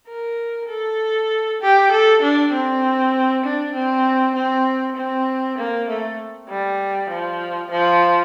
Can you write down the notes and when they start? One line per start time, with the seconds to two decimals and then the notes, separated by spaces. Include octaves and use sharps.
0.08 A#4
0.69 A4
1.61 G4
1.92 A4
2.22 D4
2.53 C4
3.44 D4
3.75 C4
4.35 C4
4.97 C4
5.58 A#3
5.89 A3
6.49 G3
7.10 F3
7.71 F3